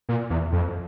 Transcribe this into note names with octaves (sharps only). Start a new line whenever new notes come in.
A#2
E2
F2